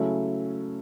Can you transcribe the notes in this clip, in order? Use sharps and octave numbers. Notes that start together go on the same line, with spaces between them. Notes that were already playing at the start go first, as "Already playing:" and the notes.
Already playing: C#3 F#3 A3 C#4 E4